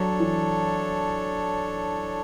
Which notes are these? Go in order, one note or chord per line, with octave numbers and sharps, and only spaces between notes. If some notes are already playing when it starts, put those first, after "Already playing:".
Already playing: F#3 D4 A4 C#5
E3